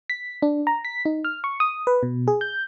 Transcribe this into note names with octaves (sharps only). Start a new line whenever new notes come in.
B6
D4
A#5
B6
D#4
F6
C#6
D#6
B4
B2
G#4
G6